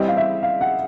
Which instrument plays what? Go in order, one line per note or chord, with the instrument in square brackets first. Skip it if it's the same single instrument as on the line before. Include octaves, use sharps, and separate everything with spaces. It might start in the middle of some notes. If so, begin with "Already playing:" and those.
Already playing: [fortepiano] E3 G3 C4 E4 G4 [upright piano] D#5
[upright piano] F5
E5
F5
F#5